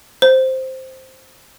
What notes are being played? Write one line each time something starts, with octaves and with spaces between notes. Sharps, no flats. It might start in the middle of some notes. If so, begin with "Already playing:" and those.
C5